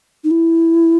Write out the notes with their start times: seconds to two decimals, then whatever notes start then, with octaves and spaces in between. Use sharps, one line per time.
0.24 D#4
0.31 E4